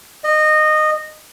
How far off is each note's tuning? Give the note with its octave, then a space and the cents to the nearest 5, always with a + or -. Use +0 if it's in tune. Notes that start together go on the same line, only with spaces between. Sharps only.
D#5 -20